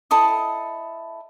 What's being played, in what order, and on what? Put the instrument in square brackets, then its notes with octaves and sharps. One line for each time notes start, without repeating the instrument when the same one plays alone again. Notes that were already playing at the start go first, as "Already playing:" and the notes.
[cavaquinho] E4 A4 D#5 D#6